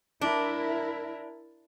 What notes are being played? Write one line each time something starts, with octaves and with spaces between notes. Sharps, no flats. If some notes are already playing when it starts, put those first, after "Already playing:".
D4 E4 A#4